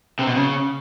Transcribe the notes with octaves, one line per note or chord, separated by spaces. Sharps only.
C3
B2
C#3